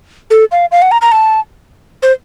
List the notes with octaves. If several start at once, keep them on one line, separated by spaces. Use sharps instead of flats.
A4
F5
F5
F#5
A#5
A#5
A5
C5